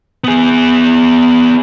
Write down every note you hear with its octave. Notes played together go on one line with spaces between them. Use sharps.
B3 G#4